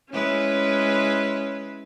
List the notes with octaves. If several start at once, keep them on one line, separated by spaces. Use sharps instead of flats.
G#3 C#4 E4 B4